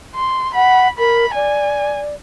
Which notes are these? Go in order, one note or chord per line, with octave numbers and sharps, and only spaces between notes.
C6
F#5 B5
A#4 B5
D5 G#5